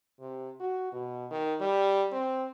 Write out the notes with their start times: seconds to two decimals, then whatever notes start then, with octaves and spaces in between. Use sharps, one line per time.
0.20 C3
0.60 F#4
0.92 B2
1.31 D#3
1.61 G3
2.12 C4